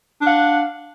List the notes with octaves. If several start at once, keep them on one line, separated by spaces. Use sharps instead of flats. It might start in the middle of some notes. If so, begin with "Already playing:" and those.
D4 F5 F#5